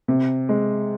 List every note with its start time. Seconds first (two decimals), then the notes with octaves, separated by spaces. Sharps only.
0.08 C3
0.49 G#3